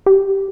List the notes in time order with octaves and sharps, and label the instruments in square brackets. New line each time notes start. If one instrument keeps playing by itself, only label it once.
[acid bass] G4